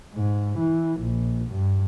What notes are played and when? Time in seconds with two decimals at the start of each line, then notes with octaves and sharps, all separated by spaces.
0.14 G#2
0.58 E3
1.01 A#1
1.51 G2